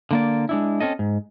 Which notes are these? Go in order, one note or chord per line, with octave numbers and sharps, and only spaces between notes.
D3 A#3 D5
G#3 D4 E4
C4 C#4 A4 D#5
G#2